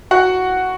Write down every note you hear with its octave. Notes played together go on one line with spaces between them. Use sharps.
F#4 F#5